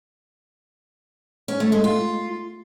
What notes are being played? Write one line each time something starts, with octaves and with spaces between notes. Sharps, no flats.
C#4
A3
G#3
F4